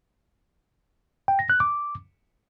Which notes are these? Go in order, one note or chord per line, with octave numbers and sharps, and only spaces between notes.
G5
A#6
F#6
D6